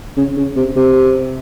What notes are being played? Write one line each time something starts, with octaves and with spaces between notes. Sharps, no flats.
C#3
C#3
C3
C3